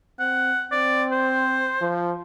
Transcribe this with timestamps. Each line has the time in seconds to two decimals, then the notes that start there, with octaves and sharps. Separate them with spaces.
0.20 C4 F#5
0.71 C4 D5
1.12 C5
1.81 F3